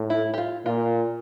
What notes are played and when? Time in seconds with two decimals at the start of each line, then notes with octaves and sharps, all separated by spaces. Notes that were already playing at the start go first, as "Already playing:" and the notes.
Already playing: A2
0.10 E4
0.34 G4
0.38 F4
0.66 A#2 F4